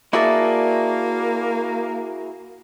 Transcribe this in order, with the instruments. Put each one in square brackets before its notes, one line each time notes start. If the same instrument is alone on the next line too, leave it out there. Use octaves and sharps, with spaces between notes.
[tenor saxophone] A#3 [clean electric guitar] E4 F#4 G#4 [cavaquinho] D5 E5 A5